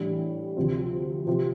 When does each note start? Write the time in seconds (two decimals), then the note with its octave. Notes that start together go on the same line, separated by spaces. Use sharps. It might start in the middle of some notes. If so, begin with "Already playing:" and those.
Already playing: A2 E3 G3 D4
0.57 D2 C3 F3 C4
1.27 C3 F3 C4 G4